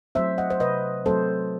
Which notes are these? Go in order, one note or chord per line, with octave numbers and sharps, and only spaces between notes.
F#3 A3 C4 C5 E5
D#5 F#5
C5
C3 B4 D#5
F#3 A3 C4 A4 C5